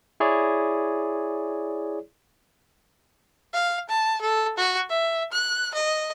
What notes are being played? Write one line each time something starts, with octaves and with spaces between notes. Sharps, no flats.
E4 G#4 C#5 D5
F5
A5
A4
F#4
E5
F#6
D#5